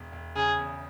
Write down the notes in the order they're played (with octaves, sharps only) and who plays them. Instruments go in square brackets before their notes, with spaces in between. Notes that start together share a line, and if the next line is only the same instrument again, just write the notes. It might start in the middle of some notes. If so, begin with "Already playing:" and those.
Already playing: [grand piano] E1
E1
[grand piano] C#3 [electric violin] G#4
[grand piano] E2